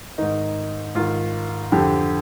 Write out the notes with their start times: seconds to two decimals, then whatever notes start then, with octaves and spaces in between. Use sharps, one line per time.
0.18 G#2 D#3 D#4
0.95 G#2 D#3 F4
1.72 F2 D3 G4